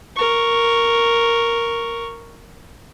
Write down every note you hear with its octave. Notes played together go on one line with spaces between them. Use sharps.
A#4 C#6